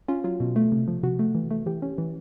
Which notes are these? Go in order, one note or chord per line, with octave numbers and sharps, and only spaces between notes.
C#4 F4
F#3 F4
B2
A3
C3
F3
C3 F#4
A3
E3
A3
E3 G4
C#4
E3